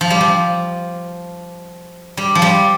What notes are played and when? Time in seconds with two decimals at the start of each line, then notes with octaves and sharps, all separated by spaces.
0.01 F3
0.10 G3
0.21 F3
2.17 G3
2.35 F3
2.42 G3